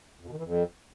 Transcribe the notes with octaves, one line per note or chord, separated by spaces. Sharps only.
F2
B2
D#3
E3
F2